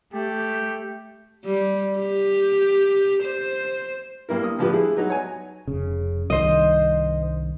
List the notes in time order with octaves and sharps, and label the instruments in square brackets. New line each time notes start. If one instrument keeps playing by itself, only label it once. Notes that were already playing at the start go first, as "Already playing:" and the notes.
[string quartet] A3 [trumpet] G4
[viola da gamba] G3
G4
C5
[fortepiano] G2 A#3 E4 A#4
D#6
A2 D3 F3 B3 G4 B4
G3 G#3 E4 G#4
F#3 B3 D#4 F#4
C#5 G#5
[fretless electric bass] F1 C#3
[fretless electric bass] C2 G2 D#3 [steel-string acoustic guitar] C5 D#5